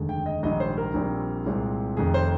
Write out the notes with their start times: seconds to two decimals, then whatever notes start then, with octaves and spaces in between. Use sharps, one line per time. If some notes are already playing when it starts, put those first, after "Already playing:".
Already playing: F1 D#2 D3 G#3
0.09 G5
0.26 D#5
0.43 A#1 G#2 D#3 G3 D#5
0.60 C5
0.78 A#4
0.94 A#1 A#2 G3 C4
1.46 C2 A#2 G#3 C4
1.97 F1 F2 D#3 G#4
2.14 C5